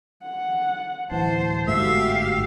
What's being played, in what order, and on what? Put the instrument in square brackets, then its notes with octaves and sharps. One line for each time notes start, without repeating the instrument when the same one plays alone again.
[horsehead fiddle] F#5
[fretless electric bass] D1 E3 [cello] C5 [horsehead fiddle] A5
[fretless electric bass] G1 G#2 A3 [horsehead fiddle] F#4 [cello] G4 F5 [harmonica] E5